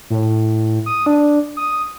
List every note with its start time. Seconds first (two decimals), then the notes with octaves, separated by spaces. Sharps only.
0.10 A2
0.86 D#6
1.06 D4
1.57 D#6